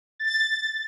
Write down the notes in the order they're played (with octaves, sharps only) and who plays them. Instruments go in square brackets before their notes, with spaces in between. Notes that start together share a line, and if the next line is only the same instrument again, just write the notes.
[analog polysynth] A6